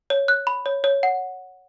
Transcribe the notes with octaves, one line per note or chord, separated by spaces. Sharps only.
C#5
F#6
B5
C#5
C#5
F#5